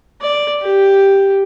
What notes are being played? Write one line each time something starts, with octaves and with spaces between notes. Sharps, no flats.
D5
G4